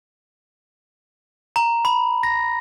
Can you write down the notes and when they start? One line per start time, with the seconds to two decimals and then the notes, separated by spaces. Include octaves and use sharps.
1.56 A#5
1.85 B5
2.23 A#6